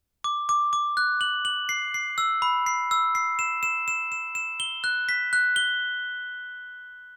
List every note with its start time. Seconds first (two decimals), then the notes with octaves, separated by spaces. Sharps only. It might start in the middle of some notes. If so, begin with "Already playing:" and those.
0.24 D6
0.49 D6
0.73 D6
0.97 F#6
1.21 F#7
1.45 F#7
1.69 C7
1.94 C7
2.18 E6
2.42 B5
2.66 C7
2.91 E6
3.15 C7
3.39 E7
3.63 E7
3.88 E7
4.12 E7
4.35 E7
4.60 G7
4.84 F#6
5.09 B6
5.33 F#6
5.56 G7